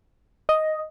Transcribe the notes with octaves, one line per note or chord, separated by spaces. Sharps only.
D#5